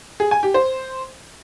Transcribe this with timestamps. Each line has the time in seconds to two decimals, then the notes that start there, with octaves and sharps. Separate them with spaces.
0.20 G#4
0.31 G#5
0.43 G4
0.54 C5